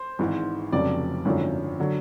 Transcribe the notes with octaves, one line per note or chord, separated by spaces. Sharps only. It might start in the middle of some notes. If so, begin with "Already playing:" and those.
Already playing: C5
G#1 G#2 E3
F1 F2 C#3 F#3 D5
G#1 F#2 D3 F3
D3 F#3